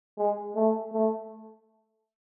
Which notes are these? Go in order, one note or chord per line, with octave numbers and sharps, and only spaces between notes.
G#3
A3
A3